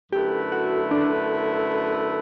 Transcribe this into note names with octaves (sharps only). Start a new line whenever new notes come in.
F#2 D3 A3 E4 G4 B4
F#4
D4